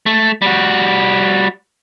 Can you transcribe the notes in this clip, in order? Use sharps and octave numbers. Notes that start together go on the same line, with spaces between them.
A3
G3 F#4